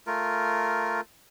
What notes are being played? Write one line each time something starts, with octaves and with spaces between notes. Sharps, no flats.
A3 F4 A#4